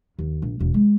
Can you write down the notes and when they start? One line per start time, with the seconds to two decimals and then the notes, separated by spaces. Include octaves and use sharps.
0.19 D#2
0.42 A#1
0.60 E1
0.74 G#3